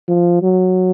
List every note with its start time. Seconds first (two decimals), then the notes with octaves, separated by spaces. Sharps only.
0.09 F3
0.43 F#3